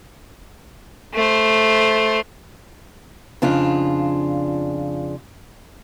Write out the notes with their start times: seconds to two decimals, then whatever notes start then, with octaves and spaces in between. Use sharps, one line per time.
1.14 A3 C5
3.42 F2 C#3 D4 F4